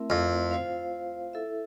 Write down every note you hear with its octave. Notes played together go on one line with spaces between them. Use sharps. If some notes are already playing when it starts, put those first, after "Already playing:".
Already playing: A3 C4 E4 A#4 E5
F2
F4 C5 F5
E4 A4 E5